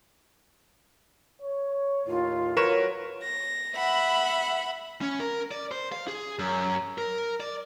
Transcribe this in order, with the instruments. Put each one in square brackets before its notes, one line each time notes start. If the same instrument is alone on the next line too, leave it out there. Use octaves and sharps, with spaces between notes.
[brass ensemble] C#5
[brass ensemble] D#2 A2 [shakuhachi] F4
[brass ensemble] F#3 [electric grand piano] A#4 B4 E7 [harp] C#5 C#6
[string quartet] A#6
E5 F#5 B5
[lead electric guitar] C#4
A#4
D5
C5
F5
G#4
F#2
A#4
D5